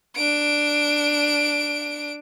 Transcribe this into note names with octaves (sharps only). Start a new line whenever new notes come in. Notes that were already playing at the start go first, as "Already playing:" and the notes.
D4 D7